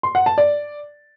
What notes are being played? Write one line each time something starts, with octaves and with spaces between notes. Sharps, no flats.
C6
F#5
A5
D5